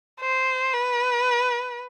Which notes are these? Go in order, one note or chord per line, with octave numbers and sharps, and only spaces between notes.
C5
B4